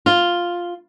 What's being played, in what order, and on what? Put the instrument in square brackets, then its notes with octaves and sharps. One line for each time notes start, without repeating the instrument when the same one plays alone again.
[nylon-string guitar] F4